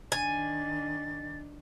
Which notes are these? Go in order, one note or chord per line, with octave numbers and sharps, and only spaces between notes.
D#3 D4 G#5 A6